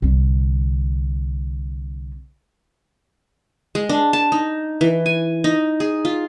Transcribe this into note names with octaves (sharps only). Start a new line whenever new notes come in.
C2 D3
G#3
D4
A5
D#4
E3
G#5
D#4
G#4
F4